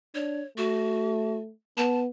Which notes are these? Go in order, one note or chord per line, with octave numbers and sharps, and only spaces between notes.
D4 C#5
A3 F#4
B3 A5